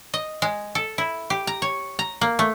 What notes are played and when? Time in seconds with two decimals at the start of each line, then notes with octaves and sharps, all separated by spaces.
0.14 D#5
0.42 G#3
0.75 A4
0.98 E4
1.30 G4
1.47 A#5
1.62 C#5
1.99 A#5
2.21 A#3
2.39 A3